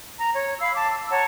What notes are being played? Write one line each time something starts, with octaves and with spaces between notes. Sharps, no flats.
A#5
C#5
F5 B5 E6
A5 D6
E6
C#5 F#5 A5 A#5